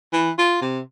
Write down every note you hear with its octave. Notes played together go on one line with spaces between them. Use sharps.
E3
F4
C3